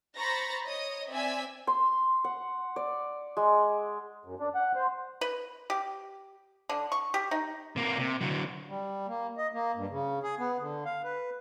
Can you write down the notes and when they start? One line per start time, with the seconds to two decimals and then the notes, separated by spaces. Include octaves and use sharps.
0.17 C5 A#5 B5 C#6 A6 A#6
0.66 C#5 D#5 D#6
1.10 C4 D5 E5 G#5 E6 B6
1.67 C6
2.24 F#5
2.76 D5
3.37 G#3
4.25 F#2
4.40 D4
4.55 F#5
4.76 C5
5.21 B4
5.70 G4
6.69 D3
6.92 C#6
7.14 G4
7.31 D#4
7.76 C3 A#3
7.99 C3
8.21 D3 F#3
8.68 G3
9.07 A#3
9.37 D#5
9.53 A#3
9.75 G2
9.89 C#3
10.23 G#4
10.39 B3
10.60 D3
10.85 F5
11.04 B4